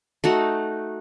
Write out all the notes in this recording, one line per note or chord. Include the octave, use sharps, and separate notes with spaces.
A3 D#4 F#4